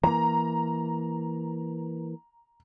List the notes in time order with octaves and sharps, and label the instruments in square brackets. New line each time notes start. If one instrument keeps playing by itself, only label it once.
[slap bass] E3 A#3 [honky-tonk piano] A#5